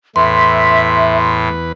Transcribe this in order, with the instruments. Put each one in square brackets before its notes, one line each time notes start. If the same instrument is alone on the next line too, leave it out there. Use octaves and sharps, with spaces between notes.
[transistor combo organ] E2 B4 [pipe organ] A2 [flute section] E5 [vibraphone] C6